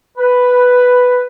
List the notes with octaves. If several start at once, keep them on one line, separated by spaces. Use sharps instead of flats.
B4